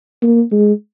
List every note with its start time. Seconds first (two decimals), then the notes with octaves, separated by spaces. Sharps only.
0.22 A#3
0.52 G#3